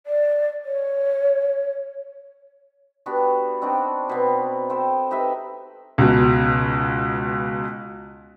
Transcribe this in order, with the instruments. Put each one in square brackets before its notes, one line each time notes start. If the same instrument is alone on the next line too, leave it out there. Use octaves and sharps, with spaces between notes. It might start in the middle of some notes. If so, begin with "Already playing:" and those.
[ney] D5
C#5
[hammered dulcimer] B3 D4 F#4 G4
C4 D4 D#4 F#4
B2 B3 C4
A4 C5 G5
D#4 G4 B4 E5
[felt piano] C#2 B2